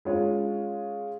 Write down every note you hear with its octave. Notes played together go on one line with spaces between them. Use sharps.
G#3 C#4 F4 C#5